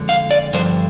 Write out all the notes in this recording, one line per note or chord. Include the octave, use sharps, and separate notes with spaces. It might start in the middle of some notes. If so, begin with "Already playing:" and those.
Already playing: F2 D3 G#3
F5
D5
G2 D3 F3 C5